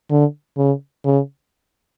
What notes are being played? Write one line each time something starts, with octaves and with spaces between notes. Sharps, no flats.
D3
C#3
C#3